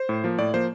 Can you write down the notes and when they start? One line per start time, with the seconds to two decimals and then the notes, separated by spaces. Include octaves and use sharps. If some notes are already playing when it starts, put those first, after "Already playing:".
Already playing: C5
0.09 A2
0.24 F3 A#3
0.38 A2 D5
0.54 F3 A#3 C5